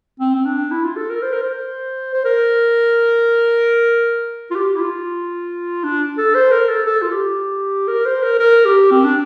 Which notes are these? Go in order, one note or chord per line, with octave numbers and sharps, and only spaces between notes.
C4
C4
D4
E4
F4
A4
A#4
C5
A#4
C5
C5
A#4
F4
G4
E4
F4
D4
A4
C5
A#4
A4
A4
F4
G4
A#4
C5
A#4
A#4
G4
C4
D4